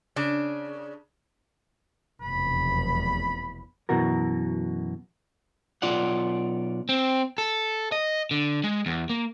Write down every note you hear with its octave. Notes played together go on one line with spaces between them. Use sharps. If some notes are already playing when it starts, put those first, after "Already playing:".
C#3 D4
F1 B1 E2 B5
F#2 B2 E3 F#4 A#4
B1 F4 D5 F#5
C4
A4
D#5
D3
G#3
E2
A#3